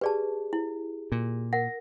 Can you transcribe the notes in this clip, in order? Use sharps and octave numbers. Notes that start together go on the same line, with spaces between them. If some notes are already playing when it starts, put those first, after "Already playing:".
G4 G#4 B4 D5 A5
E4
A#2
A#4 F#5 A#6